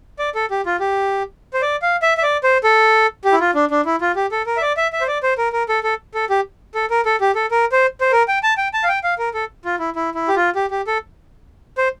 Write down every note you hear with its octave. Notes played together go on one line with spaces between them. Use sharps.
D5
A4
G4
F4
G4
C5
D5
F5
E5
E5
D5
C5
A4
G4
E4
F4
D4
D4
E4
F4
G4
A4
A#4
E5
D5
E5
E5
C5
D5
C5
A#4
A#4
A4
A4
A4
G4
A4
A#4
A4
G4
A4
A#4
C5
C5
A#4
G5
A5
G5
A5
F5
G5
F5
A#4
A4
F4
E4
E4
E4
G4
F4
G4
G4
A4
C5